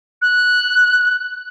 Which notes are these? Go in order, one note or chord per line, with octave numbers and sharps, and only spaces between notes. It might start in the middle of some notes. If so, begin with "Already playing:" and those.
F#6